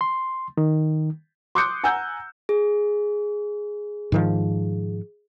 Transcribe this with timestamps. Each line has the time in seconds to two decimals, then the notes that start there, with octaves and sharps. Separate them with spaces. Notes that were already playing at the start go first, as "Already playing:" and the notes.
0.01 C6
0.57 D#3
1.55 C6 D6 D#6 F#6 G6 C#7
1.84 F#5 G#5 A#5 E6 G6
2.49 G#4
4.12 G#2 D#3 F3